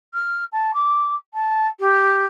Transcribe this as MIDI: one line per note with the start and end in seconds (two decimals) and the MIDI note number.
0.13 0.44 89
0.52 0.72 81
0.74 1.14 86
1.34 1.67 81
1.79 2.26 67